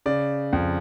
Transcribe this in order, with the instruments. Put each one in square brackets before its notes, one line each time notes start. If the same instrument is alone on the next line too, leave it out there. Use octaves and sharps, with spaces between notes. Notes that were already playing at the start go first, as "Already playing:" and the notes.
[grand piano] C#3 D5
F2